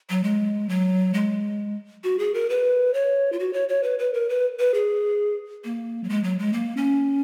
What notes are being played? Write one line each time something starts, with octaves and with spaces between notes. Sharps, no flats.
F#3
G#3
F#3
G#3
F#4
G#4
A#4
B4
C#5
F4
F#4
C#5
C#5
B4
B4
A#4
B4
B4
G#4
A#3
F#3
G#3
F#3
G#3
A#3
C#4